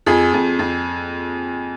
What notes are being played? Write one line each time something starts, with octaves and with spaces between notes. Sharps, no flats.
F2 G#4
F2
F2